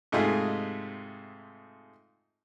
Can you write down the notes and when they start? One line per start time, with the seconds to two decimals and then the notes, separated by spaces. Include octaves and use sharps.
0.12 G#2 C3 A3 D#4 F4 G#4